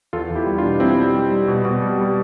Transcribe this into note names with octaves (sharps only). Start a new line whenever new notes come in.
E2 F4 A4
E2 E4 G4
G3
D4 F4
B2
G3 C4 E4
G3
G3
G3
B2
B2
G3
G3